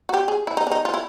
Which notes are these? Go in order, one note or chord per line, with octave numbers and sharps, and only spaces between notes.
F#4
G4
G#4
E4
D#4
D4
D#4
F4
E4